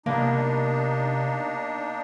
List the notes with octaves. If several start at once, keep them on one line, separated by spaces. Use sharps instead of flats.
C3 A#3 B3 D4 D#4